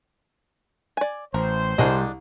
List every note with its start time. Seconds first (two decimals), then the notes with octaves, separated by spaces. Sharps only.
0.97 D5 G#5
1.34 A1 A#4 C5
1.78 C2 G3 D4 G#4 D#5